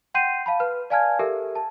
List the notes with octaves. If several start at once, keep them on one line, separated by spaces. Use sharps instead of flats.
F#5 G5 C6 G6 C7 D#7
F5 A5 B5
B4 F6
D5 F5 G#5 A5 F6 G#6
G4 A4 A#4 E5
A5